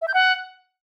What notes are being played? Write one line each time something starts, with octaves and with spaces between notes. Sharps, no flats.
E5
G6
F#5